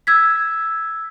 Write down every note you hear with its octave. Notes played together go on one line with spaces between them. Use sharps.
E6 G#6 B6